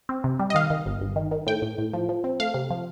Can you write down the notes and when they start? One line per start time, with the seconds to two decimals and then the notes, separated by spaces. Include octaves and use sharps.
0.09 C4
0.24 C3
0.39 G3
0.50 D#5
0.55 D#3 F5
0.70 D#3
0.86 G1
1.01 G1
1.16 D#3
1.31 D#3
1.47 A2 G5
1.62 A2
1.78 A2
1.94 F3
2.09 F3
2.24 C4
2.40 A3 F5
2.54 C3
2.70 F3